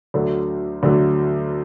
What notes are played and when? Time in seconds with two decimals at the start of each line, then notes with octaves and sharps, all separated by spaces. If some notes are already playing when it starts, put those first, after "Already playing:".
0.14 D2 D3 F#3 A3
0.83 D2 D3 F#3 A3